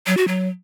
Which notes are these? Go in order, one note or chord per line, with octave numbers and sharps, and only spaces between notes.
F#3
F#4
F#3